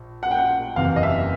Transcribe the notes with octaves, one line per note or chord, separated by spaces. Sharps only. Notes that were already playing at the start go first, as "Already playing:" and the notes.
Already playing: A#1
F#5
G5
F#5
F#1 E2 C3 E3 F5
D#5
E5